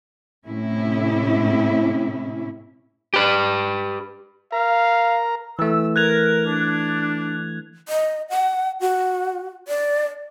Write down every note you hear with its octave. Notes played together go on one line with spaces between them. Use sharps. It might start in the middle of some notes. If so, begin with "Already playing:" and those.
A2 C3 C#4 E4
G4 B4
A#4 F5 A#5
E3 A3 E6
A#4 F#6 G#6 F7
D4
D#5
F#5
F#4
D5